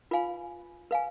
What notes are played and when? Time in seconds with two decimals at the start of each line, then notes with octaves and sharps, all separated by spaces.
0.11 F4 B4 F5 G#5 B5
0.91 B4 F5 G#5